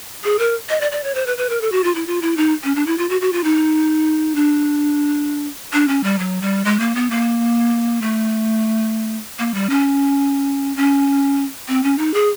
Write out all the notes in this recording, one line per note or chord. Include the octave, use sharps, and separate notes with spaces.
G#4
A#4
D#5
D5
D5
C#5
C5
B4
B4
A#4
A4
F#4
F4
E4
F4
E4
D#4
C#4
D4
E4
F4
F#4
F#4
F4
D#4
D4
D4
C#4
G3
F#3
G3
G#3
A#3
B3
A#3
A3
A#3
G3
C#4
C#4
C4
C#4
D#4
G#4